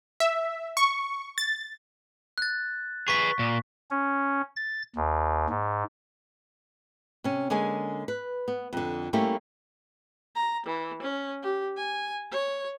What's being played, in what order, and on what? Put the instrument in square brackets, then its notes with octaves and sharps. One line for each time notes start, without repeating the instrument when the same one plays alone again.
[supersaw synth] E5
C#6
A6
[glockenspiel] F#6 A6
[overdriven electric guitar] G#4 B4 [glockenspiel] C#6 B6
[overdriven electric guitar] A#2
[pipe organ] C#4
A6
D#2
G#2
[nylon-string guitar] C3 C#4
D3 G#3 A#3 C#4 G#5
B4
B3
F2 D3
G3 A3 A#3 C#4 E4 G4
[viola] A#5
E3
C#4
G4
G#5
C#5